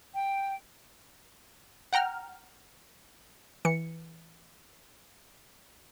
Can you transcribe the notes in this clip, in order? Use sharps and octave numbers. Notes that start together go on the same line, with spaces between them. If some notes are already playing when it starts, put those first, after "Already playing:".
G5
F#5 G5 A#5 F6
E3 C#7